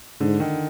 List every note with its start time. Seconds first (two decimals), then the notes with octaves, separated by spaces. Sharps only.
0.21 G#2 D3
0.40 D#3